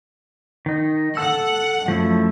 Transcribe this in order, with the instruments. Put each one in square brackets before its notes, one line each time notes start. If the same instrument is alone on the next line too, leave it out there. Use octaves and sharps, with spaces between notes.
[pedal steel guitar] D#3 D#4
[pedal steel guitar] A4 A5 E6 [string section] F#5
[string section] F#2 [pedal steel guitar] F3 A3 E4